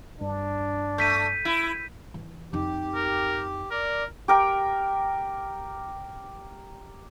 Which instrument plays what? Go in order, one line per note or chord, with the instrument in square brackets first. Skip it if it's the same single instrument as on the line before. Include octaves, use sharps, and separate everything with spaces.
[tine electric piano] G2 [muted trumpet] D4
[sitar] A3 [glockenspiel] G6 B6 D#7
[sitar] E4
[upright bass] E3
[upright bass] F2 D#4 [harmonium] G4
[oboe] A#4
[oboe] A#4 [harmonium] D5
[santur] G4 A#4 G5